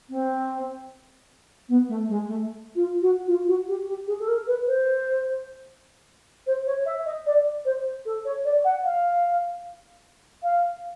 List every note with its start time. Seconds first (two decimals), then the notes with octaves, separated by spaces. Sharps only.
0.09 C4
1.68 B3
1.88 A3
2.08 G#3
2.27 A3
2.75 F4
3.01 F#4
3.27 F4
3.47 F#4
3.67 G4
3.87 G4
4.07 G#4
4.19 A4
4.27 A#4
4.47 B4
4.66 C5
6.46 C5
6.66 C#5
6.85 E5
7.05 D#5
7.25 D5
7.65 C5
8.05 A4
8.24 C#5
8.44 D5
8.64 F#5
8.84 F5
10.43 F5